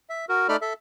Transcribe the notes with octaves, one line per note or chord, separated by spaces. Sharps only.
E5
F#4 A#4
A3 D#4 A4 D5 B5 F6
A4 E5